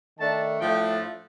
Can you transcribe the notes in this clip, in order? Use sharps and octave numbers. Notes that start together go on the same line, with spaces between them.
D#3 A3 D4 A5
A2 F3 A3 D4 G5